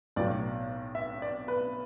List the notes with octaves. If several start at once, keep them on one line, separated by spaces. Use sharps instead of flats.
B1 A2 F#3 D5
E5
D5
B4